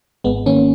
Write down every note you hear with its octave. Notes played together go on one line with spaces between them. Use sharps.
G#1 G#3 B3
D#3 A#3 C#4